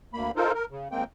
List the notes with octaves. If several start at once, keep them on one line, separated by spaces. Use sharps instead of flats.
D2 A#3 B5
D#4 F4 A4 A#4 C5
A#4
C#3
D#2 G#3 A#3 C4 G5